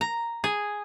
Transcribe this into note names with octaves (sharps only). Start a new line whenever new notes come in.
A#5
G#4